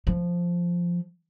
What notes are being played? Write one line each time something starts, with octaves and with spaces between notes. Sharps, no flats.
F3